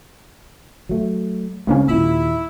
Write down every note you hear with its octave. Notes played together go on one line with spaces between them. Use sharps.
F#3 A3
C#2 G#3 A#3 C4 C#4
D#2 A#2 E4